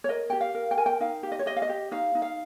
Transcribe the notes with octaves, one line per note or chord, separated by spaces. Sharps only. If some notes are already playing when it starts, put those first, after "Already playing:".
C#5
A#4 D#5
G4 G5
F5
A#4
G5
A#4 G#5
G5
D#4 F5
G4
D#5
C#5
G4 D#5
F5
D#5
G4
D#4 F5
D#4
F5